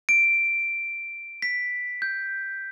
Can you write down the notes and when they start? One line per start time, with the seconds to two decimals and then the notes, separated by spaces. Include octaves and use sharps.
0.09 D7
1.42 B6
2.02 G6